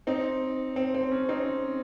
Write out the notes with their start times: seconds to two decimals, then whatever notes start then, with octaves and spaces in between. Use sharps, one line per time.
0.07 C4 D#4
0.76 C4
0.95 C4
1.11 C#4
1.29 C4 D#4